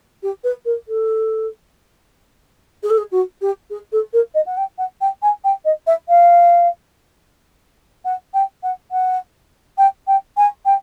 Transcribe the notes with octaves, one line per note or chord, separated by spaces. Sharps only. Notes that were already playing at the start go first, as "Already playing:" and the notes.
G4
B4
A#4
A4
G#4
A4
G#4
F#4
G4
G#4
A4
A#4
D#5
F#5
G5
F#5
G5
G#5
G5
D#5
E5
F5
F#5
G5
F#5
F#5
G5
G5
G#5
G5